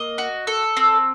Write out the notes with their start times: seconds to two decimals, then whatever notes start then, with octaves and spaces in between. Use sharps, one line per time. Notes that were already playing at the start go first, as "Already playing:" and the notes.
Already playing: A#3 D#5
0.18 F#4
0.47 A4
0.77 C4